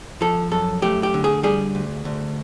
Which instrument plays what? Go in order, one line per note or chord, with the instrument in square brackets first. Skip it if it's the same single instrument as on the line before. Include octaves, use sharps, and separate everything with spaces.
[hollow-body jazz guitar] F3 A4
F#2 A4
A3 G4
G4
D3
G#4
G3 G#4
D2
D2